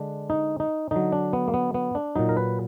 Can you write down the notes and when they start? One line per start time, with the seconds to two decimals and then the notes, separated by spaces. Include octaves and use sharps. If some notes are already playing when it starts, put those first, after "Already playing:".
Already playing: D3 G#3 D4
0.30 D#4
0.60 D#4
0.91 D3 F#3 D#4
1.12 D4
1.33 B3
1.48 A#3
1.54 B3
1.74 B3
1.95 D4
2.16 A#2 F#3 D#4
2.29 A#4
2.37 B4